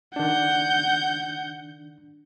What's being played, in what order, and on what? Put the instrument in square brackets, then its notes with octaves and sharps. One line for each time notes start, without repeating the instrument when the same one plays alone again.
[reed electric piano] D#3 D4 [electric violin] F#5 G6